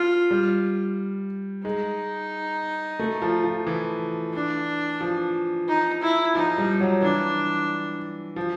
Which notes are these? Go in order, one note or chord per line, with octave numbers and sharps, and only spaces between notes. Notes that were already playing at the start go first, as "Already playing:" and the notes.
Already playing: F3 F4
G3
G#3 D#4
A3
F3
F3
E3
D4
F3
D#4
E4
F3 D#4
G3
F#3
E3 D4
F3